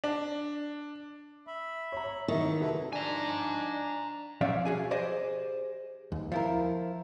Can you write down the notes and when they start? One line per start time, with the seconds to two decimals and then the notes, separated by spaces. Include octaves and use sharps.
0.04 D4
1.47 E5 B5
1.92 C#5 A#5
2.28 D#3 E3 F#3 E5 C#6
2.61 C3 E4 F#4 A4 B4
2.93 F3 D4 D#4 D5 G#5 A#5
4.41 B1 F3 C#4 D5 E5 F5
4.65 F#4 G#4 G#5
4.91 G4 G#4 C5 D5 D#5
6.12 D#2
6.32 F3 E4 A#4